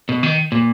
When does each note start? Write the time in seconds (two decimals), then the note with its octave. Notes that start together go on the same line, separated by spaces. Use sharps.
0.09 B2
0.23 D#3
0.52 A#2